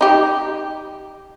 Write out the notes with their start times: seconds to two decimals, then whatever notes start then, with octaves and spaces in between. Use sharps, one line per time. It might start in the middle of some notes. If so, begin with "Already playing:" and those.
0.01 D#4 G4